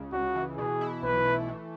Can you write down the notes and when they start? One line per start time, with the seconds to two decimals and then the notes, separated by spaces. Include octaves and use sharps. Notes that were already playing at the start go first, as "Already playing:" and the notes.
Already playing: C#2 C#3
0.12 C#2 F#4
0.35 E3
0.58 B2 G#4
0.81 E4
1.03 B1 B4
1.26 A3
1.48 E3